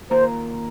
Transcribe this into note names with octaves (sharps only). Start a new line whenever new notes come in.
D#3 A#3 F4 A#4 C5